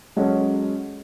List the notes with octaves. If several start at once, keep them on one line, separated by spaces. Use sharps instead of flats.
F#3 G#3 C#4 F#4 A4 C#5